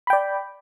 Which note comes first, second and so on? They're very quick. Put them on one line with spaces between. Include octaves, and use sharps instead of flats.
B5 G5 D5